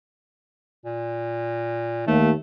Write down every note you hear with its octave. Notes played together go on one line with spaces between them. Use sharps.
A#2
D#2 A3